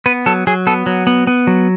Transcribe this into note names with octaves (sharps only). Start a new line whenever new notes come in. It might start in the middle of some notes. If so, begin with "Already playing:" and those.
B3 B4
F#3 A4
F#3 G#4
B3 A4
F#3
B3
B3
F#3